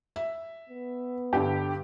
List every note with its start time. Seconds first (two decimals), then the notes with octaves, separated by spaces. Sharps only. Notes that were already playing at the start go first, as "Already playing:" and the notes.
0.16 E5
0.69 B3
1.33 G2 D3 G4